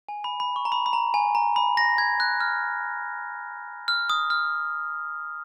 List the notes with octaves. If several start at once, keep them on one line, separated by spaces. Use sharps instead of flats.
G#5
B5
B5
C#6
A#5
B5
B5
A#5
G#5
A#5
B5
A#6
G#6
F#6
F6
F6
D#6
F6